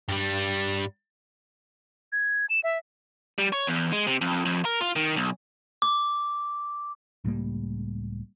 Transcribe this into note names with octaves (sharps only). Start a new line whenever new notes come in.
G2 G3
G#6
E7
E5
G3
C#5
E2
G#3
C3
F2
F2
A#4
F4
D#3
B1
D6
C#2 A2 G3 A#3